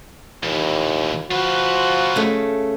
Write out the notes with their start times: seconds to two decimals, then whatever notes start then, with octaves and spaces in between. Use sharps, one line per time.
0.44 D#2 A#2 E3
1.31 F3 F4 F#4 B4
2.16 C#3 A3